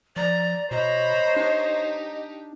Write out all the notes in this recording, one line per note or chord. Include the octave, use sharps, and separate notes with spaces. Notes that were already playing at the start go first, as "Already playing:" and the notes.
F3 D5 A#5
B2 C5 C#5 D#5 A#5 B5
D4 D#4 G4